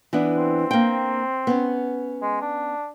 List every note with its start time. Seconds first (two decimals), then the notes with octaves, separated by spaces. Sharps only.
0.13 E3 B3 D4
0.36 C4
0.71 A#3 G5
1.47 B3 C#4
2.22 G#3
2.42 D4